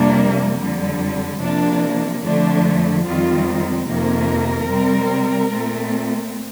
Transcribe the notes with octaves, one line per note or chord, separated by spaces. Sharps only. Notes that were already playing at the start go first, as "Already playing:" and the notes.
Already playing: F2 C3 G3 A#3 D4
F2 D3 G3
C3 F3 A#3 D4
F2 D3 F3 A3 D4
F2 D#3 G3 C4 F4
F2 C3 D#3 A#3 A#4
C3 G3 C4
A#2 A3 C4